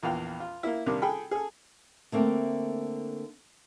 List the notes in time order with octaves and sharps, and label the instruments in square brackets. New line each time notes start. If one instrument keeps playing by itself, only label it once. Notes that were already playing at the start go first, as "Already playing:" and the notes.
[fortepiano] A#1 E2 F5 G5
F4
A#3 E4
C3 D#3 G3 A#3 D4
G#4 A4 G5 B5
G#4 A4
[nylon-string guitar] D3 A3 A#3 C4